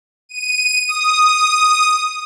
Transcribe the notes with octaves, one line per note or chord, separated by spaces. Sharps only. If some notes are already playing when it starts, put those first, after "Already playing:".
D#7
D#6